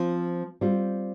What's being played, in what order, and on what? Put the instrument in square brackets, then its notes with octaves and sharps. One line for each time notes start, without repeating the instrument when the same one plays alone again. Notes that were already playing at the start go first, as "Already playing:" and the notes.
Already playing: [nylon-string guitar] F3 C4 F4
G3 C4 F4